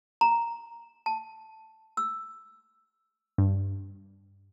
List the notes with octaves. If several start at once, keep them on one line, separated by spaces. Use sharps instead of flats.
A#5
A5
E6
G2